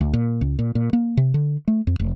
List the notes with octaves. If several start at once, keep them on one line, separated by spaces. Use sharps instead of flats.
D2
A#2
C#2
A#2
A#2
A#3
C3
D3
A3
F2
F1